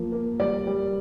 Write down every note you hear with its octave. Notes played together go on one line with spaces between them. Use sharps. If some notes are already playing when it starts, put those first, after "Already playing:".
Already playing: F3 A#3
A#3
G3 D5
G3